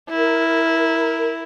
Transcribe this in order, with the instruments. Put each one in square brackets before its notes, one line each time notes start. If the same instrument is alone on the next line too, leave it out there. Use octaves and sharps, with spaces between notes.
[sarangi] E4 [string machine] A#4